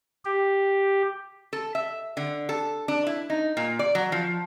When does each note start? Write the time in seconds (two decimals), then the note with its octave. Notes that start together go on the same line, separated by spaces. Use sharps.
0.25 G4
1.53 A4
1.75 E5
2.17 D3
2.49 A4
2.88 D4
3.07 E4
3.30 D#4
3.57 A#2
3.79 D5
3.95 F#3
4.12 F3